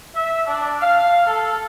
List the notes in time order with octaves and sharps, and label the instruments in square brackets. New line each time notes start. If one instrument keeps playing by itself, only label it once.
[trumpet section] E5
D4
F5
A4